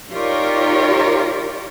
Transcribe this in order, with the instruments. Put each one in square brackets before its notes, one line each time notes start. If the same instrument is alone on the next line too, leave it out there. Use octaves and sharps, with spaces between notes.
[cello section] D#4 F4 G4 A#4 C#5 D5